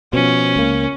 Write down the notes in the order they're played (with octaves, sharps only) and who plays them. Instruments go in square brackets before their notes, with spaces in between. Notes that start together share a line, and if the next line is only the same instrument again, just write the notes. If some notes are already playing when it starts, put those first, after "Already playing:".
[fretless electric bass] B2 F3 [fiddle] C#4
[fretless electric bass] C#2 A#3